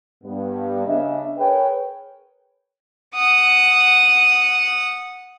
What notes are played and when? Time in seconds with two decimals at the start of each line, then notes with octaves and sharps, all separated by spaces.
0.24 G2 B3
0.87 C#3 D4 D#5 E5
1.38 G#4 A#4 B4 C#5 G5
3.15 F#5 D#6